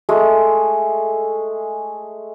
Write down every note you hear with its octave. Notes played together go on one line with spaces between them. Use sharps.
G#3 A3 G#4